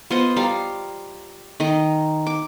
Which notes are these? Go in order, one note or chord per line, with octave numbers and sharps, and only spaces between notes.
B3 F4 C5 D#5
G3 F5 A#5
D#3 A#4 D#5
D6